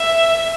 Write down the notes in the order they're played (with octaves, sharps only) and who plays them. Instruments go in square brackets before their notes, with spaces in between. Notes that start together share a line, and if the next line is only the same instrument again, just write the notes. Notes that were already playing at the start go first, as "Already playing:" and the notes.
Already playing: [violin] E5